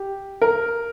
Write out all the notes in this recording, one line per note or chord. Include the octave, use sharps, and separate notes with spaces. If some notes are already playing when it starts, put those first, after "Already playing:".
Already playing: G4
A#4